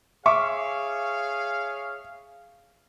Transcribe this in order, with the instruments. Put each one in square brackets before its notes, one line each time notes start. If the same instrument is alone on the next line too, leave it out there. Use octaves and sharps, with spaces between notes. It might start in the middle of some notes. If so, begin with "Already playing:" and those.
[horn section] G#4 C#5 F5 [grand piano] E5 C#6 D6